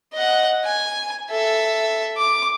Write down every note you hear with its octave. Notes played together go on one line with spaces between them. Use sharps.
D#5 F#5
G#5
A4 E5
D6